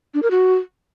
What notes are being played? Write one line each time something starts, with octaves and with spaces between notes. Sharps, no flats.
D4
A#4
F#4